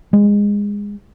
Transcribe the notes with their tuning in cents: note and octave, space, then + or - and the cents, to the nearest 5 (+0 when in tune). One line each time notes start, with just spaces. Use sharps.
G#3 -20